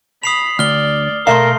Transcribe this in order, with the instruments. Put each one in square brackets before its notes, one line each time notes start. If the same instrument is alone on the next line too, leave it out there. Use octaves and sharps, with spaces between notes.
[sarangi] B5 [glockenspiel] D#6 C7 F7
[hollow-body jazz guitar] D2 [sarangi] D5 [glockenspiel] F6 G7
[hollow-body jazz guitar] B2 E5 F5 [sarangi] A3 [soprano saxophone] A#4 [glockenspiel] C6 C7